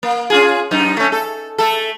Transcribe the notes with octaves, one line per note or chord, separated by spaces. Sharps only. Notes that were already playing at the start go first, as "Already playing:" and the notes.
A#3
C#4 F4 G#4
F#2 D#4
A3 C#4
A4
A3 A4